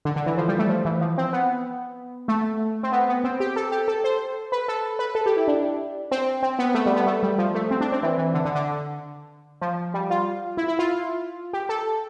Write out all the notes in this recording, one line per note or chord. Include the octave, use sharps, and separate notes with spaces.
D3
D3
E3
F3
G3
A3
F3
E3
F3
C4
B3
A3
C4
B3
B3
C4
G4
A4
G4
A4
C5
B4
A4
B4
A4
G4
E4
D4
C4
C4
B3
A3
G3
B3
A3
G3
F3
A3
C4
D4
C4
E3
E3
D3
D3
D3
F3
G3
F4
E4
E4
F4
G4
A4